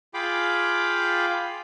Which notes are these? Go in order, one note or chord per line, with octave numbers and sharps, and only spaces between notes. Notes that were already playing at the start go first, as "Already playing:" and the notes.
F4 G#4 F5 G5 B5 D6